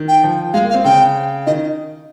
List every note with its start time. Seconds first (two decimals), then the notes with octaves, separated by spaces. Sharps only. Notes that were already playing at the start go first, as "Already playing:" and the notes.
Already playing: D#3
0.08 G5
0.24 F3
0.53 G#3 F5
0.64 A#3
0.70 F5
0.74 C4
0.84 C#3 G5
1.46 D#3 D#5